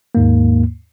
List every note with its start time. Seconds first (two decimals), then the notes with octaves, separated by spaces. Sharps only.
0.15 D#2 G#2 A#3